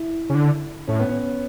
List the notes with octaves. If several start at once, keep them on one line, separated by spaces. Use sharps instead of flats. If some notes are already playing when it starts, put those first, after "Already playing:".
Already playing: E4
C#3
D3
A2 C#4
B3
C#4